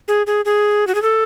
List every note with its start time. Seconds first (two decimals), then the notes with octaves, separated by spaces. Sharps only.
0.08 G#4
0.27 G#4
0.45 G#4
0.87 F#4
0.95 G#4
1.02 A4